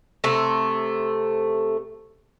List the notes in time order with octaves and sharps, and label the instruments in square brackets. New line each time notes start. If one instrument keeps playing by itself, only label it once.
[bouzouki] C3 A3